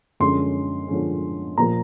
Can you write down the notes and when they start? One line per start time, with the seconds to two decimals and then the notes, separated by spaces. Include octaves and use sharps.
0.20 F#2 D3 F3 G#3 C#4 C6
0.88 F#2 D3 F3 G#3 C#4
1.57 A#2 F3 A#3 A#5